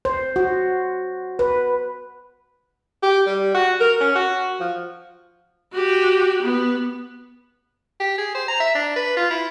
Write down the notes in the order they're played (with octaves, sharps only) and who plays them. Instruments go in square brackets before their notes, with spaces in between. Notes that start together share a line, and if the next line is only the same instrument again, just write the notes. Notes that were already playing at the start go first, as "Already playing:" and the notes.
[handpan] C5
F#4
B4
[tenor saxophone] G4
G3
F#4
A#4
C#4
F#4
F3
[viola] F#4 G4
B3
[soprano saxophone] G4
G#4
C5
A#5
E5
D4
B4
F4
E4